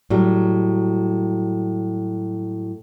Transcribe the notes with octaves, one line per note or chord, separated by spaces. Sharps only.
A2 F#3 G3